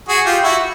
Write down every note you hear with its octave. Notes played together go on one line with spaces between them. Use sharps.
F#4 G#4
F4 G4
E4 F#4